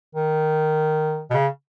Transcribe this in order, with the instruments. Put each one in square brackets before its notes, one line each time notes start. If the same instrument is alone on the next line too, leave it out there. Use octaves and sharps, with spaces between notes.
[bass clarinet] D#3
B2
C#3